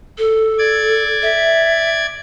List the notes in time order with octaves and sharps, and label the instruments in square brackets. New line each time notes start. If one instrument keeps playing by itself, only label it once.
[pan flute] A4
[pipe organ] D5 G#6
[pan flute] E5